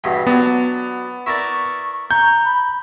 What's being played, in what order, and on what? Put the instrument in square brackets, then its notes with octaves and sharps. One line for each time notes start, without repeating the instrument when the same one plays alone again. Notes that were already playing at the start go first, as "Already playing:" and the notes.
[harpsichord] E2 G2 B2
[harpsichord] F#3 D4 [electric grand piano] B3
[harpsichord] E4 A#4 D5 [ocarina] C#6
[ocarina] A#5 [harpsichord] C#6 [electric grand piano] G6
[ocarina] B5